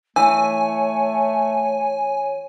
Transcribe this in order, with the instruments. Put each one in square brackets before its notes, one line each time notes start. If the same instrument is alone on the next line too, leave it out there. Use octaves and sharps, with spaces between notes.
[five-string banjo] E3 [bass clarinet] A3 [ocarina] C#5 [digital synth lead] G#5